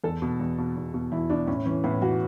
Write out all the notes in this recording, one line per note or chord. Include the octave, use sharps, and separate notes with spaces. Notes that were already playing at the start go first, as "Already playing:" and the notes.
E2 A4
B2
E2
B2
E2
B2
E2 E4
B2 D4
A2 C#4
E3 C#4
A2 B3
E3 F#4